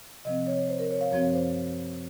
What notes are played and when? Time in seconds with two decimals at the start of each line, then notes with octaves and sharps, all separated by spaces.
0.25 C3 F3 C4 D#5
0.47 C#5
0.69 C5
0.79 A#4
0.91 C#5
1.01 F5
1.12 F#2 F3 C4 C#5
1.34 C5